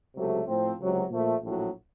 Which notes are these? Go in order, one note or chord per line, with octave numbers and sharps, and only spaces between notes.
C#2 C3 F#3 A3
A2 F3 C4
C#2 C3 F#3
A#2 F3 A3
A#1 A2 F#3